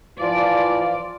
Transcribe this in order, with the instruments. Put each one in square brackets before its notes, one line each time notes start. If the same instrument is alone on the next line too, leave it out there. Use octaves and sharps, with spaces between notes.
[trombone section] E3 F3 [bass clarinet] F4 [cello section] D5